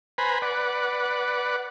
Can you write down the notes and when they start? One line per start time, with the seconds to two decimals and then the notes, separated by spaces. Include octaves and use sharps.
0.18 B4 C5 G#5 A#5 B5
0.42 B4 D5 F#5